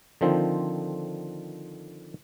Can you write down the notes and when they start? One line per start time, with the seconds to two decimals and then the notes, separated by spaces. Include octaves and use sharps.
0.21 D3 D#3 F3 C4